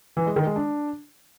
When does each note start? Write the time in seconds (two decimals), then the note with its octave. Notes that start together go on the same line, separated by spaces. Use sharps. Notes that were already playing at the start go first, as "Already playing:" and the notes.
0.17 E3
0.26 G#3
0.36 D#3
0.46 G#3
0.56 D4